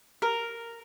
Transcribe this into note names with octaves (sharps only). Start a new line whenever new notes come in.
A#4